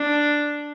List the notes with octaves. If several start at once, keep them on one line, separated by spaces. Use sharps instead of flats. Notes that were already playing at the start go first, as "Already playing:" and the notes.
Already playing: D4